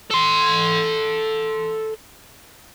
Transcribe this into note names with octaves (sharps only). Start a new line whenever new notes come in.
A4 C6